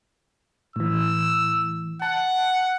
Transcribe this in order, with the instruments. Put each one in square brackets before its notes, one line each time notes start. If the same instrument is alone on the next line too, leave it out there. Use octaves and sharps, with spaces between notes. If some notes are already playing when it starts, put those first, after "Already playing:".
[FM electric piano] A2 E3 [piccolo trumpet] E6
[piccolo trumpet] F#5 [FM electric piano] A5